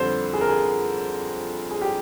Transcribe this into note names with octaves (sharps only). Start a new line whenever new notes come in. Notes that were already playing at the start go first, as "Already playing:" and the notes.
Already playing: F2 D3 G3 C4 C5
G#4
A#4
G#4
G#4
G4